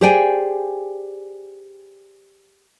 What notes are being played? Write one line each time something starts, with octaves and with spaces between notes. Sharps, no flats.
G4 G#4 C5 D5 G5 G#5